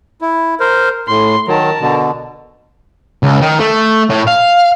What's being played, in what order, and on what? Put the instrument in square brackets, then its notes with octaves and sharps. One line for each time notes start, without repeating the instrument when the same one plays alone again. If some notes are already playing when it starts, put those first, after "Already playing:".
[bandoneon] E4
A#4 C5
[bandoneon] A2 [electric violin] C6
[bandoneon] D#3 F#3 [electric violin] A#4 A5
[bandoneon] B2 D3
[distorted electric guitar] C#2
D#3
A3
A2
F5